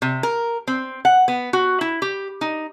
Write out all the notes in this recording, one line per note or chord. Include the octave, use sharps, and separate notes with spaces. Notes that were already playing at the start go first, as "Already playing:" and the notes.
C3
A#4
C4
F#5
B3
F#4
E4
G4
D#4